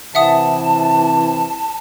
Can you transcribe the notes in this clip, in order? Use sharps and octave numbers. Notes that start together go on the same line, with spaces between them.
C3 E3 E5 F#5 A5 D#6